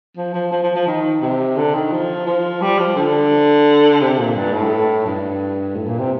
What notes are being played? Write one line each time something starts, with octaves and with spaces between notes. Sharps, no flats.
F3
F3
F3
F3
F3
D#3
C3
D3
D#3
F3
F3
G3
F3
D3
C3
A#2
G2
A2
G2
A2
A#2
C3